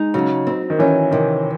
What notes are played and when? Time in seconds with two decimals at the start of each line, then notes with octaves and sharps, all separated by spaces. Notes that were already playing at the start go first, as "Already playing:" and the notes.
Already playing: G#3 D#4
0.14 C#3 F#3
0.47 C4
0.70 D#3
0.79 E3 C#4
1.11 C3 D#3